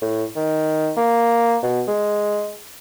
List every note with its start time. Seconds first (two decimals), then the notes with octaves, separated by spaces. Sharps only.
0.01 A2
0.36 D#3
0.97 A#3
1.62 B2
1.87 G#3